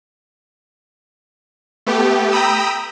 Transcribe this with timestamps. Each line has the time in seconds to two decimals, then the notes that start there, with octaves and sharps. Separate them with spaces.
1.87 A3 B3 G4
2.32 G5 A#5 B5 D#6 E6